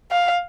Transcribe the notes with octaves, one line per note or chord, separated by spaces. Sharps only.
F5